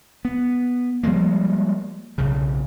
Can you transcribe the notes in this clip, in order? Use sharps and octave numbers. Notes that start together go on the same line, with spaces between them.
B3
F3 G3 G#3 A#3
B1 C#3